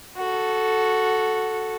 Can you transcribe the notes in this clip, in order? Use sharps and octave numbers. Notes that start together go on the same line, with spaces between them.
F#4 A4